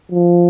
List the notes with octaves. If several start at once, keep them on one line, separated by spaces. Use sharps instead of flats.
F3